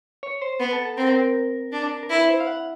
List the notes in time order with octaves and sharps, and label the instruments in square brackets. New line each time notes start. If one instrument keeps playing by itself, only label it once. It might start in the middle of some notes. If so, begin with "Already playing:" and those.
[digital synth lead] C#5
C5
[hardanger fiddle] B3 [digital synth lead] B4
[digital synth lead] A4
A4
[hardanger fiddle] C4 [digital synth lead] A#4
[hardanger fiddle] D4
[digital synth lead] A#4
[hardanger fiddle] E4 [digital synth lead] B4
[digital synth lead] C5
F5
F#5